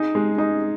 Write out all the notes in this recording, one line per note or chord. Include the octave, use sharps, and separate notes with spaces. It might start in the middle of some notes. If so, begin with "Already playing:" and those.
Already playing: D#4 G#4
G#3
D#4